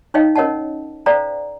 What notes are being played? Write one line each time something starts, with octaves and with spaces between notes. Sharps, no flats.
D#4 C#5 D#5 F5 G5
C#4 A#4 C#5 D#5 F#5 A5
A4 C5 D5 F5 G5 A#5